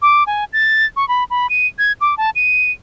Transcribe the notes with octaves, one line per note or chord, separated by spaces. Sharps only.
D6
G#5
A6
C#6
B5
B5
D#7
G#6
D6
A5
D#7